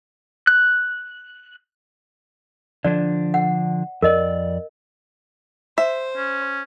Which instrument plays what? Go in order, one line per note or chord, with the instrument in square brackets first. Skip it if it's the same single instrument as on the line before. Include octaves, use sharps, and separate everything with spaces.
[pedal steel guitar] F#6
[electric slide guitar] D3 F3 D4 [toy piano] D5
[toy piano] F#5
[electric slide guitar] F2 D5 [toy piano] A#4 D#5
[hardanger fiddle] C5 [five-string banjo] E5
[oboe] C#4